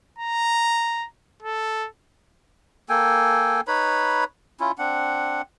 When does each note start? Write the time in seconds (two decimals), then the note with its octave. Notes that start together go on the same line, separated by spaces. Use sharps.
0.19 A#5
1.43 A4
2.89 A#3 A4 G5 G#5
3.68 D#4 B4 C#5 B5
4.60 C#4 E4 F4
4.78 C4 D4 F#5